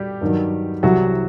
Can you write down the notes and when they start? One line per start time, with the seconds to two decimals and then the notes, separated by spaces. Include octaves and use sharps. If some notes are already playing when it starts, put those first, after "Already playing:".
Already playing: G3 G4
0.21 G2 D#3 F#3
0.83 C2 C3 E3 F#3 G3 F#4